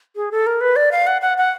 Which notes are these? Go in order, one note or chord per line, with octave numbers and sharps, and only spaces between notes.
G#4
A4
A#4
B4
D5
F5
F#5
F#5
F#5